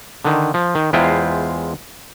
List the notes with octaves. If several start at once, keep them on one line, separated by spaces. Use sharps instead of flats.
D3 D#3
F3
D#3
E2 G#3 E4 F4 C5 G5